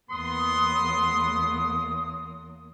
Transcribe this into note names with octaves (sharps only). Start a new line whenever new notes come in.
E2 A#3 B3 C6 D#6